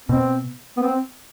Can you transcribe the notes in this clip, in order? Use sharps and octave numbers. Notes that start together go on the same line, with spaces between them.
B2 C4
B3
C4